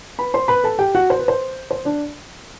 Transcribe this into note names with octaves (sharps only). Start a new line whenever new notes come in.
B4 B5
C5 C6
B4 B5
A4 A5
G4 G5
F#4 F#5
C5
B4
C5
C5
D4 D5